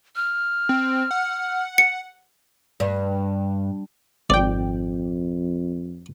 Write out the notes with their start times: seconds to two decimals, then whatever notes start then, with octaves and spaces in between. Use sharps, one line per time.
0.16 F6
0.69 C4
1.11 F#5
1.78 C#7
2.80 G2
4.30 G#1 F2 D5 G5